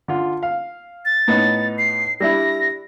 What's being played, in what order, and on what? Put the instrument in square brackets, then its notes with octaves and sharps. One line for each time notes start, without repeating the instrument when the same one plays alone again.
[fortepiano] D3 F4
F5
[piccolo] A6
[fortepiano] A2 B3 D#4
[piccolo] C7
[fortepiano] G3 D4 E4 [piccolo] A#6